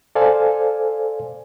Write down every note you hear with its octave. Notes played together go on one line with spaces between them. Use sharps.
A4 C5 D5 F5 G#5